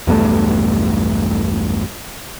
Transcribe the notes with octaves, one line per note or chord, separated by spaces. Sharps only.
B1 E2 G2 A3